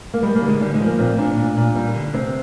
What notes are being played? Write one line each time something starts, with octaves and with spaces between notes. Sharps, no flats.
A#3
G3 G#3
A#3
D3
G#3
D3 G3
G#3
F3
A#3
A#2 C4
A#2 D4
A#2
A#2
G3
D3
C3 C4